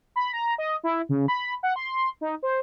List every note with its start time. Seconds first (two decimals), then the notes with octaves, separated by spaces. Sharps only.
0.16 B5
0.33 A#5
0.58 D#5
0.84 E4
1.09 C#3
1.28 B5
1.63 F#5
1.76 C6
2.21 D#4
2.43 C5